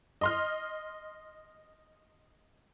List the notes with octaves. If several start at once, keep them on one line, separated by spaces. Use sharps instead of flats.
D#5 C6 F6